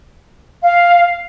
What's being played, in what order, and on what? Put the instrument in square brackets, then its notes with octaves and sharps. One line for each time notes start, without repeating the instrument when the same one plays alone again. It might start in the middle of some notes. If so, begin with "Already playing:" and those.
[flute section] F5